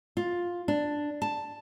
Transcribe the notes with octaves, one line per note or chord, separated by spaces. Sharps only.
F4
D4
A5